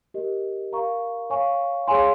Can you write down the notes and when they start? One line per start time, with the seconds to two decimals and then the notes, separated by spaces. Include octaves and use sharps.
0.14 G4 A#4 D#5
0.72 A#4 F5 A#5 C#6
1.30 C#5 F5 G#5 C#6
1.88 G#4 C#5 F5 G#5 C6